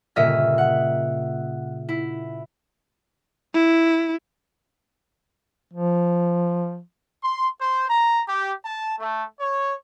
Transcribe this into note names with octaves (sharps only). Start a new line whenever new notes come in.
G1 A#2 C#3 D#5 E5 F6
F#5
E4
E4
F3
C6
C5
A#5
G4
A5
A3
C#5